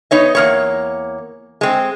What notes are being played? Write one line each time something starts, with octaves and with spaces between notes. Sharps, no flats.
B3 D#4 C#5 D#5
E2 A#3 C#5
G#3 C4